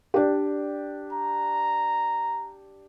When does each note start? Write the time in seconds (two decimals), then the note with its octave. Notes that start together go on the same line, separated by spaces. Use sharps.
0.14 D4 G4
1.12 A#5